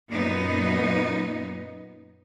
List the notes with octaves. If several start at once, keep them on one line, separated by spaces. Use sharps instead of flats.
F#2 A#2 B3 D#4